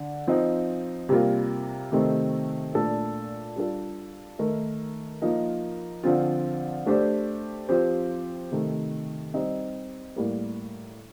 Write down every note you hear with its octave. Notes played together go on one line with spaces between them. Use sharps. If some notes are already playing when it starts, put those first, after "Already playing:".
Already playing: D3
F3 C4 D#4
C3 G3 A#3 F4
C3 D#3 A3 C4 D#4
A#2 A3 D4 A4
G3 D4 F4 A4
D#3 A3 D#4 A#4
F3 A#3 D#4 A#4
D3 F3 C4 F4
A3 D4 G4 C5
F3 C4 G4 C5
C3 D#3 A3
G3 C4 D#4
A2 G3 A#3